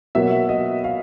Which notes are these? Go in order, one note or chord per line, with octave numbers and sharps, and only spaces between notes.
B2 F#3 A#3 E5
D#5
F5